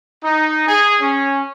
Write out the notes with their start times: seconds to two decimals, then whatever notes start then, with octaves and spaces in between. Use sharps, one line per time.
0.23 D#4
0.67 G#4
1.00 C#4